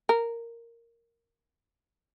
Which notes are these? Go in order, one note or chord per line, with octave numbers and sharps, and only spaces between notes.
A#4